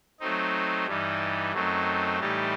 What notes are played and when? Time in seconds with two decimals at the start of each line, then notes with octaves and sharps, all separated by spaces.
0.20 F#3 A3 C4 D#4
0.86 G2 E3 G3 D#4
1.53 F#2 F#3 A3 C4 D#4
2.19 A2 E3 G3 D#4 G4